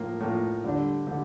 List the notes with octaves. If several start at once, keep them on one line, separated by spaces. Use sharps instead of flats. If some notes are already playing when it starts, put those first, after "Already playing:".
Already playing: A2 F3 A#3
A2 F3 A#3
D3 G3 D4
D3 G3